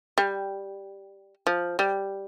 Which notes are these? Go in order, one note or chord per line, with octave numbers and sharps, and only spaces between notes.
G3
F3
G3